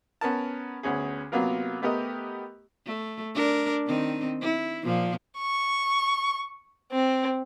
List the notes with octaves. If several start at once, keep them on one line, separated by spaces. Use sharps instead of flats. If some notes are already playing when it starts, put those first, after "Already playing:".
B3 C#4 A#4 A5
D2 B3 C#4 G#4
C3 F#3 A#3 B3 F4 A#4
A3 B3 G4 A#4 D#5
A3
D4 A#4
D#3 C4 D#4
E4
A#2 F3
C#6
C4